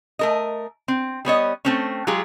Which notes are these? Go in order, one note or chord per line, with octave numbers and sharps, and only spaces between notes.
A3 A#4 D#5
C4
G3 B3 C#5 D#5
A3 C4 C#4
F#3 G#3 F4 G4 G#4